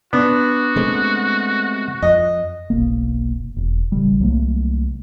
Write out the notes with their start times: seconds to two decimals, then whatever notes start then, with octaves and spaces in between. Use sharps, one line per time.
0.13 B3 D4 F#4
0.76 C3 G#3 A3
2.02 F2 D#5
2.70 F1 B1 A#3
3.57 E1
3.92 A1 C#3 G3
4.20 C2 F#3 A3 A#3